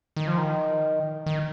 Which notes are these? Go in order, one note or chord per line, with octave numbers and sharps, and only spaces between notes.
D#3
F3
D#3
D#3